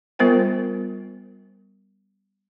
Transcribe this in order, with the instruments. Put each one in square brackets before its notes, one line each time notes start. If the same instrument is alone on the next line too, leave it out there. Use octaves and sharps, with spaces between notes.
[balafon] G3 B3 F4 A#4 C5 G5